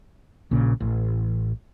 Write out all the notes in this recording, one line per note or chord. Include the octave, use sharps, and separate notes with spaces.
A#1 A#2 C#3
A1